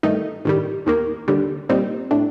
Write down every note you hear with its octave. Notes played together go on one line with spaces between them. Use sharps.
G2 D#3 A3 D#4
A1 G2 D#3 G3
D#2 D#3 A#3
D#2 D3 G3
A#2 G3 C4 D#4
A2 A3 D4